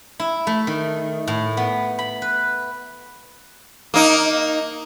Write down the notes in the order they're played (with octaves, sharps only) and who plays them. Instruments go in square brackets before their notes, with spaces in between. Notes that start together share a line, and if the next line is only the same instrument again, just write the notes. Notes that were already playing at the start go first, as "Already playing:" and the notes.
[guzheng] E4
A3
D#3
A2
B3
B5
B4
[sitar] A#3 D#4